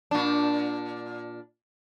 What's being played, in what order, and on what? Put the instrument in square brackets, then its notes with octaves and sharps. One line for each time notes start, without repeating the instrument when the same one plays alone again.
[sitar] A#2 D4